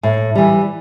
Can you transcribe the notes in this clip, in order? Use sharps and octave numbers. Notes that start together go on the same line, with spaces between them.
A2
E3 G3